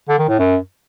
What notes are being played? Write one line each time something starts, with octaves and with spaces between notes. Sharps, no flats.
D3
D#3
A2
F#2